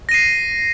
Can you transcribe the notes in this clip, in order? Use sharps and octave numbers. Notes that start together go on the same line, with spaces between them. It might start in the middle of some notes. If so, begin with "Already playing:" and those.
A#6 C7 D#7